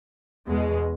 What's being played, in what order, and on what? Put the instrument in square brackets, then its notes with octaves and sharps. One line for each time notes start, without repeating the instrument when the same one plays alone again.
[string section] E2 B2 G#3